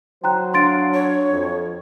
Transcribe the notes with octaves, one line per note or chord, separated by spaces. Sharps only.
F#3 C5 G5 A#5 F#6
D4 F5 C6 A6 D7
C#5
F2